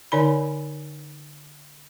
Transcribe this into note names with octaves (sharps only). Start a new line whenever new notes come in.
D3 D#4 C#5 D5 G#5 B5